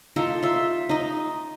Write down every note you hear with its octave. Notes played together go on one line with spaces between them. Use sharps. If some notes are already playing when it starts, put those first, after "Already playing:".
D#4 F4 A4
F4 E5
D#4 D#5